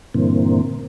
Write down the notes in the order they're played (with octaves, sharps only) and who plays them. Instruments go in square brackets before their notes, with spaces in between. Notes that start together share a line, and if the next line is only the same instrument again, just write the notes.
[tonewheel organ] G2 A#2 D3 E3 A#3 C4